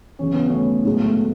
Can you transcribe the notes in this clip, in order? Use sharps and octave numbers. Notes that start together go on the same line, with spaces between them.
E2 C#3 F#3 C#4
B3
A3 C#4
A2 F#3 G#3 B3
A3
A3